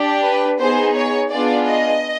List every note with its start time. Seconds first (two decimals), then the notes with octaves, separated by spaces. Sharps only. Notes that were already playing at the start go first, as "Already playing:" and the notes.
Already playing: D4 G4
0.23 B4
0.59 B3 D#4 G#4 C5
0.95 C#5
1.30 B3 D4 F4 G#4 D5
1.67 D#5